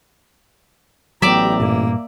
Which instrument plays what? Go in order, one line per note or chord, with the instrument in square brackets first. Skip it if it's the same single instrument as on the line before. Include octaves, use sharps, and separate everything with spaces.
[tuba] A1 [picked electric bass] F#3 B3 [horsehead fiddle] G4 A#5 [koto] D5 E5
[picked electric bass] G2 A#2 [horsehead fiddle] A#3